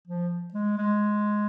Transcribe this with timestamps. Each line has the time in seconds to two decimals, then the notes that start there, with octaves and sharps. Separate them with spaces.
0.07 F3
0.54 G#3
0.78 G#3